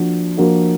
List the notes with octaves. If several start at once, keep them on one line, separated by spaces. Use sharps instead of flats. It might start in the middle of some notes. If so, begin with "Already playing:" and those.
Already playing: F3 A#3 D4 F#4
F3 A#3 D4 F#4